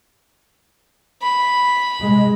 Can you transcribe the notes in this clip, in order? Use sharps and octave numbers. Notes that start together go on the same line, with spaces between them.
B5
C3 G#3